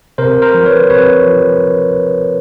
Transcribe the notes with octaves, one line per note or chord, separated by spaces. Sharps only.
C3 A#4 C5
A#4 C5
F3
B4 C#5
C3 B4 C#5
F3